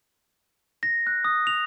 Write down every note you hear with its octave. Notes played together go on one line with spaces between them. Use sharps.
A#6
F#6
D#6
F7